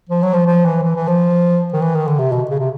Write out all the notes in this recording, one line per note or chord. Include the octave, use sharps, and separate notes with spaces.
F3
F#3
F3
F3
E3
E3
E3
F3
D#3
E3
D#3
D3
C3
B2
C#3
C3